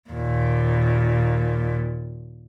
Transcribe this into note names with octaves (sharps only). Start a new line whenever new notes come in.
D#2 A#2